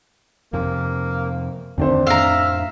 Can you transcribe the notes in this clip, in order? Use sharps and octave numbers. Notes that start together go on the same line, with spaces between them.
F2 C3 A#3
E2 D3 D#3 A3 C4 D4 C5
F2 A2 E5 F5 A#5